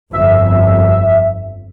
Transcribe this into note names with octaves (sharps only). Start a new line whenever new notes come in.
G1 F2 E5